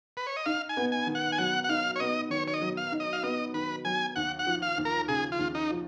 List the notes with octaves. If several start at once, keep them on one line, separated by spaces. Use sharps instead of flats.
B4
C#5
D#5
D#4 F5
G#5
B3
G#5
D#3
F#5
G#5
F#3 F#5
F#5
D#4 F5
C#5
B3 D#5
D#3 C#5
C#5
D#5
F#3
F5
D#4
D#5
F5
B3 D#5
D#3 B4
F#3 G#5
D#2 F#5
F#5
F3
F5
D#2
A#4
C#3 G#4
F4
D#2
D#4
F3